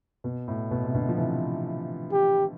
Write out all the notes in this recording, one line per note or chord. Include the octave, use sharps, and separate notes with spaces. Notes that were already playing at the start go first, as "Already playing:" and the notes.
B2
A2
B2
C3
B2 D3
F3
C3 E3
G4